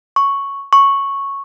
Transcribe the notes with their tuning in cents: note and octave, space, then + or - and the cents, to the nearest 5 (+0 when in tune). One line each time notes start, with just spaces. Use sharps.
C#6 +0
C#6 -5